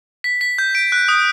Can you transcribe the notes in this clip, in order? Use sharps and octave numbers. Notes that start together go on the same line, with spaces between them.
B6
B6
G6
D7
F#6
D#6